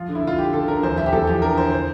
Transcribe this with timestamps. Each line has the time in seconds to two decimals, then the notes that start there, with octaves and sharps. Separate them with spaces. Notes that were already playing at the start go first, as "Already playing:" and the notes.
Already playing: F3 F4
0.09 D3
0.15 E4
0.23 D3 F4
0.38 D3 G4
0.53 D3 A4
0.68 D3 A#4
0.83 E2 C5
0.97 E2 E5
1.06 G4
1.12 E2 A4
1.27 F3 G4
1.42 D3 A#4
1.57 D3 C5
1.72 C5